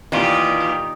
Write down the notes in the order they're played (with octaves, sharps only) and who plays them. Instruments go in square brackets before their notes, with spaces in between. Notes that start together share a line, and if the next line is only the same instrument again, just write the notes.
[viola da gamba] A#2 G4 [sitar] D#3 [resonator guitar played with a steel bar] E3 G3 F4